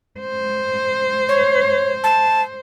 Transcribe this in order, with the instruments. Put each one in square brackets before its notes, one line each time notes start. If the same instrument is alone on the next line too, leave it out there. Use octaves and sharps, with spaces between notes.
[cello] C5
[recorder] C#5
A5